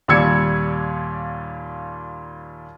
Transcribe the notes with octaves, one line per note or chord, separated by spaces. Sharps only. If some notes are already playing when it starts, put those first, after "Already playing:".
D#2 A#2 G3 E6 G#6 C#7